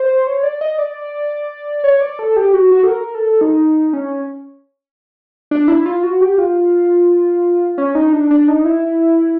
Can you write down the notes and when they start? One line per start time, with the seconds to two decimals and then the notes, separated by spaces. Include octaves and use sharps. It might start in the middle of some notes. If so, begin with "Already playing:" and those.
Already playing: C5
0.27 C#5
0.43 D5
0.61 D#5
0.78 D5
1.84 C#5
2.01 D5
2.19 A4
2.37 G4
2.53 F#4
2.71 F#4
2.83 A4
2.88 A#4
3.15 A4
3.41 D#4
3.93 C#4
5.51 D4
5.68 E4
5.86 F4
6.03 F#4
6.21 G4
6.38 F4
7.78 C#4
7.95 D#4
8.13 D4
8.31 D4
8.48 D#4
8.65 E4